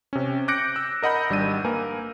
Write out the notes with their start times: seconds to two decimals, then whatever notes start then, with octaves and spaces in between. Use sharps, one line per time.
0.13 C3 C#4
0.48 D6 F#6 G6 A#6 C#7 D7
0.76 E6
1.02 A#4 D#5 F#5 B5 G6
1.30 G#1 G3 D4 E6 D#7
1.65 A#3 A#4 B4 G#5